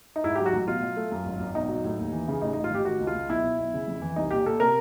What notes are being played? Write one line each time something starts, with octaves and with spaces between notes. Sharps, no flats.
D#4
G#2 E4
F#3 G4
F#4
A1
B2 F4
F#3
A3
F#2
G#1
G#1
B1 D#4
F#3
A2
D#2
E3
C#3
A1 D#4
G#2 D#4
F4
A1 G4
D#3 F#4
C#2
F4
C#2
B1 E4
B2
B1
C#3
F2
E3
C2 D#4
A#2 G4
A#2 A4
C3 A#4